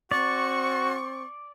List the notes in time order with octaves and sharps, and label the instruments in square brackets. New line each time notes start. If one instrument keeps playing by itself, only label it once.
[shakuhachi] C4 [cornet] F#4 [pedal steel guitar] D5 [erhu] C#6